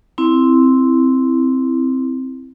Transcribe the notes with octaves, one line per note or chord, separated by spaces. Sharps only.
C4 E4